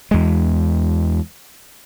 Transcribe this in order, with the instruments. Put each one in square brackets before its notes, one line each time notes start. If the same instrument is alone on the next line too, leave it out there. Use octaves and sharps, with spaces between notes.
[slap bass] E2 G#3